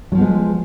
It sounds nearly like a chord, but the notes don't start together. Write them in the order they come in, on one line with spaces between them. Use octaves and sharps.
F#3 F3 B3 G#3 G#4